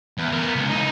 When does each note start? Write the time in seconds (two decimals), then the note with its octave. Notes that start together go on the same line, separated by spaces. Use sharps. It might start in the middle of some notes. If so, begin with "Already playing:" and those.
0.18 E2
0.33 B3 A#4
0.55 C#2
0.69 D#4 E4